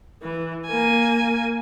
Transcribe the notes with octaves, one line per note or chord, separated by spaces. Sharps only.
E3
A#3 G#5